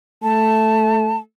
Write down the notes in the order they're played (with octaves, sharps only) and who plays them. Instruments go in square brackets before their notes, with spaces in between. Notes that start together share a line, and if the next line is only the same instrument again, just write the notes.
[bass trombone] A3 [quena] A5